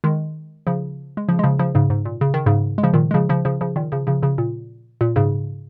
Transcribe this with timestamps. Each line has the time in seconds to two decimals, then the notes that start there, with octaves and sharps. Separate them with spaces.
0.04 D#3 G#3
0.67 C#3 F3
1.17 G#3
1.29 C#3 F3
1.39 G#3
1.43 C#3 F3
1.59 C#3 F3
1.75 G#2 C#3
1.90 G#2
2.05 A#2
2.21 C#3
2.34 D#3
2.46 G#2 C#3
2.78 G#3
2.83 C#3 F3
2.93 A#2 D#3
3.11 G#3
3.14 C#3 F3
3.29 C#3 F3
3.45 C#3 F3
3.61 C#3 F3
3.76 A#2 D#3
3.92 C#3 F3
4.07 C#3 F3
4.22 C#3 F3
4.38 A#2
5.01 A#2
5.16 G#2 C#3